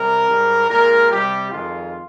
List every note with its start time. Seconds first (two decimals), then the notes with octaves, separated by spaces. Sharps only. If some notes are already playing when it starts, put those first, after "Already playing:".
Already playing: C3 G3 A#4
0.27 G#2 G3
0.69 A#2 G#3 A#4
1.11 C3 G3 G4
1.52 F2 D#3 G#3 F4